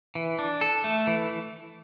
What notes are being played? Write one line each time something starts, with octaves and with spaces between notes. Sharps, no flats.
E3
D4
A4
A3
E3